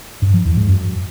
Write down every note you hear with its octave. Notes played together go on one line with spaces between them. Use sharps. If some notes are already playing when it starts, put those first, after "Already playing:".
G2
F3
E2
G#2
F#2